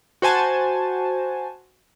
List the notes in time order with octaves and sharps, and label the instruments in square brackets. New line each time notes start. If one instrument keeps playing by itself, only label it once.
[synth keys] F#4 C5 G#5 A5